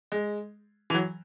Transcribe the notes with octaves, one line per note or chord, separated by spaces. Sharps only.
G#3
E3
F#3